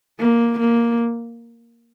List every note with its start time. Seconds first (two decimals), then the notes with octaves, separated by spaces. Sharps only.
0.20 A#3
0.60 A#3